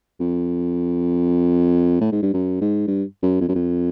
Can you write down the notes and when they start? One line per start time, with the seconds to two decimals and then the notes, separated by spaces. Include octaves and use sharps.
0.20 F2
2.01 A2
2.12 G#2
2.23 G2
2.34 F#2
2.61 G#2
2.87 G2
3.23 F#2
3.41 F2
3.49 F#2
3.55 F2